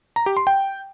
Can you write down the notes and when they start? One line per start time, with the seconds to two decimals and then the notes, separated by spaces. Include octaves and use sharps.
0.16 A#5
0.26 G4
0.37 C6
0.47 G5